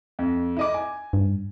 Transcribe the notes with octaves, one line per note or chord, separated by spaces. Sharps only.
F2
E4 D#5 D6
G#5
G2